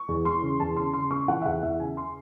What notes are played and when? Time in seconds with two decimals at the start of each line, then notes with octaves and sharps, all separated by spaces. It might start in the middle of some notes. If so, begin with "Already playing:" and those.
Already playing: C#6
0.08 E2
0.25 E3 C6
0.42 C#3
0.60 E2 A5
0.76 C#3 C6
0.94 C#3 C6
1.11 C#3 C#6
1.28 E3 F#5
1.41 E5
1.45 E2 F#5
1.63 E2 E5
1.80 C#3 G#5
1.97 C6